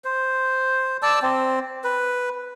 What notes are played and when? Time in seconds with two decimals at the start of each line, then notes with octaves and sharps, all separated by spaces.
0.05 C5
1.02 D5 A5 E6
1.22 C4
1.84 B4